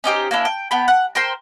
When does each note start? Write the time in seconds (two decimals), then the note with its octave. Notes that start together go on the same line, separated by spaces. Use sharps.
0.04 C#4 D#4 G4 C5
0.31 A#3 C#4 D4 E4
0.45 G5
0.71 B3 G5 B5
0.88 F#5
1.15 A#4 C5 G5 C6